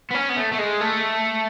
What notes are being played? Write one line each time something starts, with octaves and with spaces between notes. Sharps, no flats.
B3
C#4
B3
A3
A3
G#3
A3